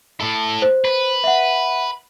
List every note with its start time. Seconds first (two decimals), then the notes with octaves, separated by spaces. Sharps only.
0.21 A2 A4
0.62 C5
0.85 B4
1.24 E5 F#5